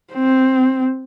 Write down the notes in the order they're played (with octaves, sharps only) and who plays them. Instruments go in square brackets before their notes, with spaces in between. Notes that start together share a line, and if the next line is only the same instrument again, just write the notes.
[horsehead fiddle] C4